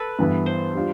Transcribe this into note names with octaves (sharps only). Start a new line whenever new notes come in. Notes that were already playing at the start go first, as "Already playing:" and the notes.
Already playing: A4 B4
G2 E3 B3 E4
C5
G3 D4 F4